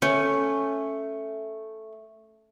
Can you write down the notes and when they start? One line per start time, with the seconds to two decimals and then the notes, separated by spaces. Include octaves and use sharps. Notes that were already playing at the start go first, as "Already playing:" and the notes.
0.02 A3 C#4